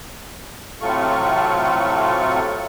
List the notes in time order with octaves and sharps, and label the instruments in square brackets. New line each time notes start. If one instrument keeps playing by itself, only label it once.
[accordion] A2 C3 F#3 A3 F4 C#6